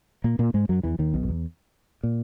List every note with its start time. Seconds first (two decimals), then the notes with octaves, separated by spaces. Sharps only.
0.24 A#2 A#3
0.39 A#2 A#3
0.54 G#2 G#3
0.69 F#2 F#3
0.83 E2 E3
0.99 D#2 D#3
1.14 B1 B2
1.23 F#2
1.29 E2
2.03 A#2